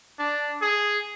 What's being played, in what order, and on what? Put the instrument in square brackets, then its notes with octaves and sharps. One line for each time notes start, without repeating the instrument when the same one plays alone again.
[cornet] D4
G#4